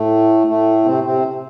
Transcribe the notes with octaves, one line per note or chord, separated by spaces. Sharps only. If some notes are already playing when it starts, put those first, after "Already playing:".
Already playing: A2 A3
A2 A3
C3 C4
C3 C4